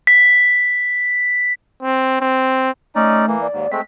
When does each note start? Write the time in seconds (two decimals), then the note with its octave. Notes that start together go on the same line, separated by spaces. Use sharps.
0.07 B6
1.83 C4
2.21 C4
2.95 A3 C#4 D#4 D5
3.27 E3 A#3
3.42 D5
3.53 D#2 G#2
3.72 G#3 A3 C4 B6